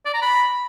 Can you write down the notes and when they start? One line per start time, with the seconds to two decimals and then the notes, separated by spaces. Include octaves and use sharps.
0.06 D5
0.14 A#5
0.22 B5